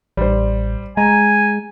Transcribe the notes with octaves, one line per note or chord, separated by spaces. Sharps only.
A1 G3 C5
G#3 G#5 A#5